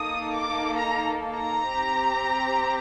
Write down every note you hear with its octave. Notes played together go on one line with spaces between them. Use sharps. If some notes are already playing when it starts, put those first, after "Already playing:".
Already playing: A#3 D#4 A4 D#6
D6
A#5
A#5
C4 G4